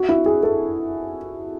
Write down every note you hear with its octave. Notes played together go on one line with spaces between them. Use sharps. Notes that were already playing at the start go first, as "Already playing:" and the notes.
Already playing: F#4
E4
G#4
A4